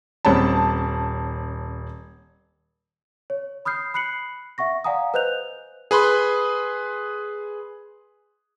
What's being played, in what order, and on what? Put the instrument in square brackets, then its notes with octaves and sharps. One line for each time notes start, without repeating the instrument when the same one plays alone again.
[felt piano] D#1 C4 C#4 A5
[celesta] C#5
B5 D#6 F6 G6 C7
B5 F#6 C7 C#7 F#7
E5 F#5 C#6 A#6
D5 F5 F#5 G#5 A#5 D#6
B4 C5 D#5 F#6 G6 F7
[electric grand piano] G#4 B4 B5 C6